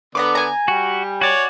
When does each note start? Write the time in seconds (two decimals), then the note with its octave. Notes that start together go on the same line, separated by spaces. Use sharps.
0.15 D3 B3 D5 A#5 B5 D6
0.35 G#5 A#5
0.68 G3 F#4 G4
1.21 F#4 C#5 D5